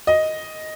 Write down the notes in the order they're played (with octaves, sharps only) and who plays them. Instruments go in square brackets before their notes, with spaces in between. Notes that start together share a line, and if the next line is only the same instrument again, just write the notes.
[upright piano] D#5